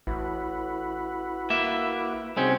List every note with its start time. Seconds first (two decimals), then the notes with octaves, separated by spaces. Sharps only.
0.07 A1 E4 F#4 B4
1.50 A#3 E5
2.37 C2 C4 C#4 D#4 F#4 G#4